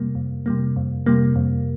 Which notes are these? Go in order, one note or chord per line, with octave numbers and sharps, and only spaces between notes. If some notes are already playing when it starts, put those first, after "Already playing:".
Already playing: F2 C3 G3 A#3
F2
C3 G3 A#3
F2
C3 G3 A#3
F2